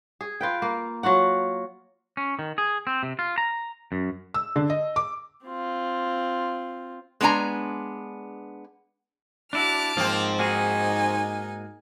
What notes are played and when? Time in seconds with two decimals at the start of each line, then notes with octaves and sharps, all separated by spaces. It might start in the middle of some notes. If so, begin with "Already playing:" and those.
0.21 G#4
0.41 F4 B4 G5
0.62 A#3
1.03 F#3 F4 F#4 F#5
2.17 C#4
2.39 D#3
2.58 G#4
2.87 C4
3.03 C3
3.19 F4
3.38 A#5
3.92 F#2
4.34 E6
4.56 D3
4.70 D#5
4.96 D6
5.45 C4 F4
7.21 G#3 B3 D4 G#5 A#5
9.53 D4 E4 F#4 A5 D6 F6
9.97 G#2 F3 A#3 C4
10.39 A#3 D#4 F#4 G#4 G#5